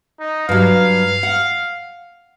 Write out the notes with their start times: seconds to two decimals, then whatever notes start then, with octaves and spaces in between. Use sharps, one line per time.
0.20 D#4
0.49 G2 F#3 F5
1.23 F#5